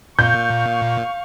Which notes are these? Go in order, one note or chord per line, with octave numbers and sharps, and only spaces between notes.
A#2 F5 C#6 G6